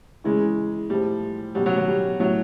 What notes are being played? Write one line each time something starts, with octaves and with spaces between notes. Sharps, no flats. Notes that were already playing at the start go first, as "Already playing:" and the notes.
C#3 E3 G#3
A2 F3 G3
B2 F#3 G3
F#3
F#3
G3
A2 F#3